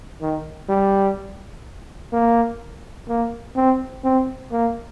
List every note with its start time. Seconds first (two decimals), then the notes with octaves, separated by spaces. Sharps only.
0.22 D#3
0.69 G3
2.13 A#3
3.08 A#3
3.56 C4
4.04 C4
4.52 A#3